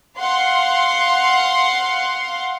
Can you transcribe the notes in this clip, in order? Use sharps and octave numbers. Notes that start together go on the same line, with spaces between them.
F5 F#5 C6